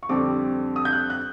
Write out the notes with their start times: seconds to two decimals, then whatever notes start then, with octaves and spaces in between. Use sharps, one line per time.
0.03 C#6
0.09 F2 D3 G3 C4 D6
0.76 D#6
0.85 G6
0.93 F#6
1.10 F#6